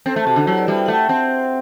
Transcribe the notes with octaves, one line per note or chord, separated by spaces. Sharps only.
C4 A4 C5
A3
C3 F#4 A4
D3
F#3 E4 G4
B4 D5
G3 C5 E5
G5
A3 F#5
E5 G5
C4